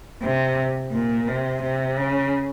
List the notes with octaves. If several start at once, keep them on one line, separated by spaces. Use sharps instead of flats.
C3
A#2
C3
C3
C#3